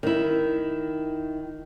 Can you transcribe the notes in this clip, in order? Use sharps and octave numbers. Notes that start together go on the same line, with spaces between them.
D#3 E4